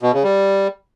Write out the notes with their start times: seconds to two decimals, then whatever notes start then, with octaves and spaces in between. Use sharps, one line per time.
0.03 B2
0.13 C#3
0.24 G3